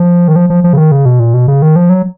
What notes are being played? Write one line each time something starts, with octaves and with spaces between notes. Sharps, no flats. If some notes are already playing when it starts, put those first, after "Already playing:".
Already playing: F3
D#3
F3
F3
F3
C#3
D#3
C#3
B2
A#2
B2
C#3
D#3
F3
F#3